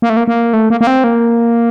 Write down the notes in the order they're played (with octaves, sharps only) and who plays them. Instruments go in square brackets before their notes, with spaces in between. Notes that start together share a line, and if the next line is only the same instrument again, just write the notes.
[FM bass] A#3
A3
A#3
A#3
A3
A#3
A#3
C4
A#3